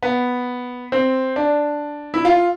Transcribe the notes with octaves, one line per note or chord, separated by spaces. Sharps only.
B3
C4
D4
E4
F4